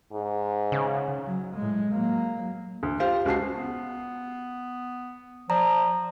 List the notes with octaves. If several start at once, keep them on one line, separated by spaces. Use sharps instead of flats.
G#2
C#3
F#3
A2 G#3
F#3 A#3
D2
F4 G4 C5 F5
C#2 F#4 A5 C7
B3
F3 D5 A#5